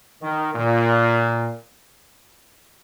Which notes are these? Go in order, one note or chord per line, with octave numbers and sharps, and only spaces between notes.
D#3
A#2